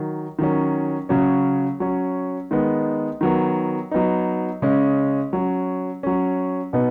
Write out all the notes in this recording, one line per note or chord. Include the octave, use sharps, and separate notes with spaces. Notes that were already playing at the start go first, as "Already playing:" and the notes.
Already playing: D#3 F#3
D#3 F#3 C#4
C#3 F#3 C#4
F#3 C#4
D#3 G#3 B3 D#4
D#3 F#3 B3
F#3 B3 D#4
C#3 G#3 C#4
F#3 C#4
F#3 C#4
B2 B3 D#4